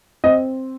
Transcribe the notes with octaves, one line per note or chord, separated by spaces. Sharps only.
C4 D#5